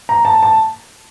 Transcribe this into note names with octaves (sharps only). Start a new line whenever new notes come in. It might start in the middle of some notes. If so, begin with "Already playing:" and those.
A#5
A5
A5